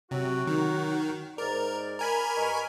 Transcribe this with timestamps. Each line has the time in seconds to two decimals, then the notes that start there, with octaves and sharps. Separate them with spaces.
0.11 C3 F#3 F#4
0.47 D#3
1.38 G#2 A#4 D5
1.99 A#4 G#5 B5
2.35 G2 D#5 C#6